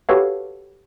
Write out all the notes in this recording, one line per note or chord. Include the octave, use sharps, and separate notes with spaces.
F#4 G4 A4 B4 C#5 F5